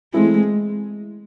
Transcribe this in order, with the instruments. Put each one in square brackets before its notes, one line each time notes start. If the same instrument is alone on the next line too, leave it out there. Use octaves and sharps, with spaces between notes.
[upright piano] E3 A3 C4 E4 [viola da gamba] G#3